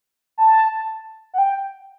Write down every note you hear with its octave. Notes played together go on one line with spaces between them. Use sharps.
A5
F#5
G5